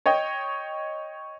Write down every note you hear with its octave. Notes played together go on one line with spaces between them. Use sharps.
C#5 D#5 G5